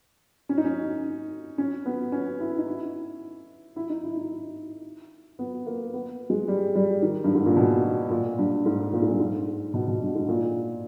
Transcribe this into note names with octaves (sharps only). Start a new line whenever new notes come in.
C#4
D#4
C#4
C#4
B3
C#4
E4
D#4
E4
E4
D#4
E4
D#4
B3
A#3
B3
G#3
G3
G3
D#3
G2
G#2
A#2
B2
A#2
G2
G#2
A#2
G#2
G2
G#2
B2
B2
G2
G#2
A#2